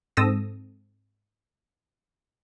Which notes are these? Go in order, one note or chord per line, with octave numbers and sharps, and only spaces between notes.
G#2 C4 A4 D#6 E6 A#6